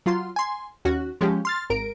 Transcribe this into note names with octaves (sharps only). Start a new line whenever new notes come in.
F#3 F4 C6
G#5 C6
D#2 C#4 F#4
F3 G#3 C#4 G4
C6 F6 A6
G#1 A#4 D7